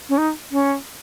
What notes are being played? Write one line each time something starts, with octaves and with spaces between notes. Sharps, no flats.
C#4
D#4
C#4